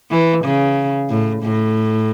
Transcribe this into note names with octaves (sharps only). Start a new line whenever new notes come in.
E3
C#3
A2
A2